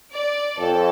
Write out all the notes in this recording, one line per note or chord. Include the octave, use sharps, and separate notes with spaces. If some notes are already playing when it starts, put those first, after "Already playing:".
D5
F2 A4